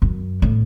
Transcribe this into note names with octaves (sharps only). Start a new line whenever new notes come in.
F#2
A2